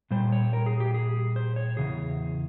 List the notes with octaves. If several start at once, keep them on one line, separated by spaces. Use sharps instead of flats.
A#2 G3 C5
C#5
A#4
G#4
G4
G#4
C5
C#5
E2 C#3 G#4